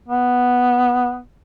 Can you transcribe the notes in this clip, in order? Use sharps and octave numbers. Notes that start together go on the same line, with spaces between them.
B3